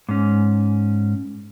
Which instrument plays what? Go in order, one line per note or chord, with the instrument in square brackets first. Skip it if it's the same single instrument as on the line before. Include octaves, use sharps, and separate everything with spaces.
[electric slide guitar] G#2 C#4